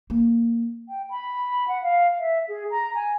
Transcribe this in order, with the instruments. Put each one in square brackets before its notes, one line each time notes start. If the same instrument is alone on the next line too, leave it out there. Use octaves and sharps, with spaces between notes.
[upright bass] A#3
[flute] G5
B5
F#5
F5
E5
G#4
A#5
G#5